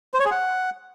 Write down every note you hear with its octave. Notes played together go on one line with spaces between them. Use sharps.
C5
C#5
G#4
F#5